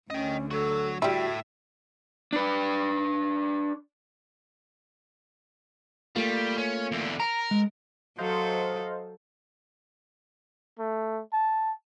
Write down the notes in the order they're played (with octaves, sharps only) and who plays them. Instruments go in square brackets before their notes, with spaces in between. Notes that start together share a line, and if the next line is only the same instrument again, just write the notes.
[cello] D2 D3 [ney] C#4 [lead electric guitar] D#5 G5
[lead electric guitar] F#3 F#4 [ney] A4
[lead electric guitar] A2 [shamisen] G3 E4 [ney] F#4 [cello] E5
[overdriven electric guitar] D4 B4
[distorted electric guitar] G3 [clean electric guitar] A3 A#3 F4
[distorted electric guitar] C#4
E2 D3
[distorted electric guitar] A#4 [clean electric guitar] A#5
[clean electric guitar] G#3
[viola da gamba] F#3 A4 [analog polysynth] C5 D#5 F5
[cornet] A3
A5